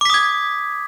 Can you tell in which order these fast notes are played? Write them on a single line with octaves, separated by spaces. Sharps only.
D6 B6 D#6 G#6